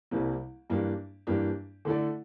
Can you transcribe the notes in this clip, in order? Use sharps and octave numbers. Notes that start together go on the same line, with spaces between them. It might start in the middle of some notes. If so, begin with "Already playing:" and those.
C2 C3 G3 A#3 E4
G2 E3 A#3 D4 G4
G2 E3 A#3 D4 G4
D3 A3 E4 A4 D5